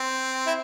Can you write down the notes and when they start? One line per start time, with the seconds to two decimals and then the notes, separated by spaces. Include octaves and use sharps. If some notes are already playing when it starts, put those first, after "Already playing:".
Already playing: C4
0.47 E4